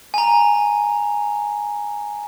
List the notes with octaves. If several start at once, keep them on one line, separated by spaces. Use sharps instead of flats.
G#5 A#5